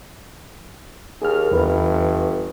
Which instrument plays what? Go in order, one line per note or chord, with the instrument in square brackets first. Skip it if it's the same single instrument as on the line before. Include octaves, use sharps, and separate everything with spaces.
[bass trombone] D#2 [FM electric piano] G#4 F6
[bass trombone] G1 [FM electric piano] E2 E3 B4